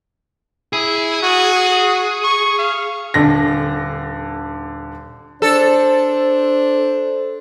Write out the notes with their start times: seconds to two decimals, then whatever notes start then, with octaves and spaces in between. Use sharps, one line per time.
0.73 E4 G#4
1.23 F#4
2.24 C#6
2.58 F5
3.14 D#1 D3 A#6
5.42 D4 A4 C5